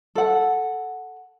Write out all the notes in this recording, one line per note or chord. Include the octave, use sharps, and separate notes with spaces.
A4 F#5